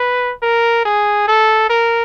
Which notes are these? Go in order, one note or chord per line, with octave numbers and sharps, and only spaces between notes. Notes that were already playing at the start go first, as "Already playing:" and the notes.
Already playing: B4
A#4
G#4
A4
A#4